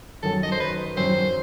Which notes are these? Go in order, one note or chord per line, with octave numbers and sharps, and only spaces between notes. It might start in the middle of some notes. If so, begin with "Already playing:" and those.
F#2 D#3 F#3 A4
D#5
C5
B4
F#2 D#3 F#3 C5